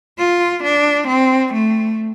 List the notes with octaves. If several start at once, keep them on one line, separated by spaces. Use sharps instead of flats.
F4
D4
C4
A3